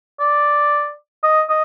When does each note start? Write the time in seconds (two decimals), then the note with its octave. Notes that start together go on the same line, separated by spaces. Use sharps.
0.20 D5
1.23 D#5
1.49 D#5